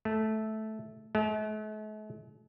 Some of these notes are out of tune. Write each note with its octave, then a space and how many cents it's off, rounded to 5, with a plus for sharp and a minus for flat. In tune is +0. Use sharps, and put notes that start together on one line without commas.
A3 -10
A3 -45